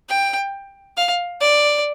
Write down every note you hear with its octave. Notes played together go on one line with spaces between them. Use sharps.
G5
F5
D5